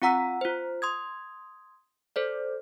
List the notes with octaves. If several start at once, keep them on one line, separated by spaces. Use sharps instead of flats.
C4 F4 F#5 A#5 E6 B6
F4 C5
C6 D#6 G#6
A4 C5 D5